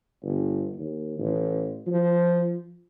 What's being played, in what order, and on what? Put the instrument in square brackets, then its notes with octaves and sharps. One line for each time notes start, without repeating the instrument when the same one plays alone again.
[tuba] G1
D#2
A1
F3